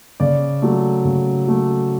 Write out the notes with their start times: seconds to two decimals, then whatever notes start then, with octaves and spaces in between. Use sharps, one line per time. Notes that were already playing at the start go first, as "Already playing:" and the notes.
0.20 C#3 D5
0.62 F#3 A3
1.05 C#3
1.47 F#3 A3